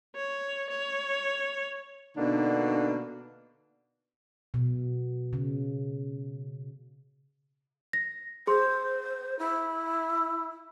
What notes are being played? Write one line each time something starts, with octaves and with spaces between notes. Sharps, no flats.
C#5
C#5
B2 D3 A#3 D4 D#4
B2
C#3
A#6
G#4 C5 C6
E4